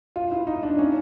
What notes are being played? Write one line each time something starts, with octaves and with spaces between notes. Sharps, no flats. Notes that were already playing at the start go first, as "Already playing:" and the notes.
F4
E4
D#4
D4
C#4